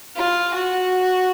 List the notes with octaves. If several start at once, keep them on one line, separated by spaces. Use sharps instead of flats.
F4
F#4